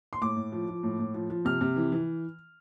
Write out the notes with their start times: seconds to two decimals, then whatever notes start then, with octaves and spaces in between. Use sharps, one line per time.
0.13 C6
0.21 A2 D6
0.36 A2
0.52 F3
0.68 F3
0.83 A2
0.99 A2
1.14 F3
1.30 F3
1.45 C3 F6
1.61 C3
1.76 E3
1.92 E3